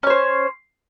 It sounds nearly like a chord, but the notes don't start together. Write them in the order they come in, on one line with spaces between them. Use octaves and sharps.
C#4 C#5 C5